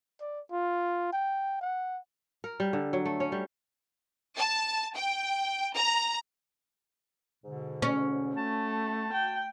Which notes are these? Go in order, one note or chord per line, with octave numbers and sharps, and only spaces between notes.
D5
F4
G5
F#5
A#4
G3
D3
F#3
A3
C#4
G3
A5
G5
A#5
G#2 B2 D3
C#4
A3 F#4 A5
G5